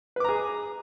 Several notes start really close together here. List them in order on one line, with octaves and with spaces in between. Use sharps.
B4 D6 A#5 G#4